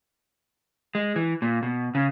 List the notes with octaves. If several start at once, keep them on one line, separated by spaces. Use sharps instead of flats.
G#3
E3
A#2
B2
C#3